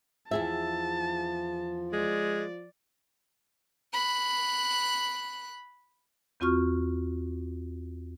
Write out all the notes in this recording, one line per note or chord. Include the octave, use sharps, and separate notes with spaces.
E2 F3 G#4 E5 A5
G#3 D5
B5 F#6
E2 C4 F4 F#4 C#6 F6